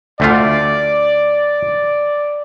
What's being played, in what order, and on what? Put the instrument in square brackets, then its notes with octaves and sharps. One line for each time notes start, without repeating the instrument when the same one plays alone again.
[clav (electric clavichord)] D2 A3 F4 [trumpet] D5